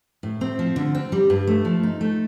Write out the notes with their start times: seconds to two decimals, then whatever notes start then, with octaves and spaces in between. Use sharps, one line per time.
0.23 A2
0.41 C4
0.59 F3
0.76 D3
0.95 C4
1.12 G3
1.30 G2
1.47 A3
1.65 F3
1.83 D#4
2.01 A3